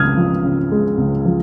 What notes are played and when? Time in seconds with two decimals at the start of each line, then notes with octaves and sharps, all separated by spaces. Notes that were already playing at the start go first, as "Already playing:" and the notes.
Already playing: C#2 C#3 G#3 D#6 F6 G#6
0.17 F3
0.44 C#3
0.72 G#3
0.98 C#2
1.25 F3